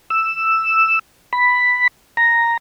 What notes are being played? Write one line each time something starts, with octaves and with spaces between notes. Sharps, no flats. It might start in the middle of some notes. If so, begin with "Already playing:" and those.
E6
B5
A#5